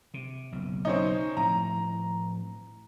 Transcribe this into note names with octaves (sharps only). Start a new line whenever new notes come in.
C3
F#1 B1
C4 C#4 D#4
A2 F3 C4 A#5